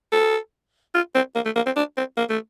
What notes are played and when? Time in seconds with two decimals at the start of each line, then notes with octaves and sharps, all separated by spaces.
0.12 A4
0.95 F4
1.15 C4
1.35 A#3
1.45 A3
1.56 A#3
1.66 C4
1.76 D4
1.97 C4
2.17 A#3
2.30 A3